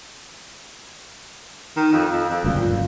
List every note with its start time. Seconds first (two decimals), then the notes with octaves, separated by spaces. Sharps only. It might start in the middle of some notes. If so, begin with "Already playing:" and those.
1.76 D#3
1.92 F2
2.11 F2
2.30 F2
2.44 G1 C#2 F#2 A#2